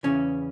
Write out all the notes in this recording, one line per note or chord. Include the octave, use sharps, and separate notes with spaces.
E2 C#3 E3 C#4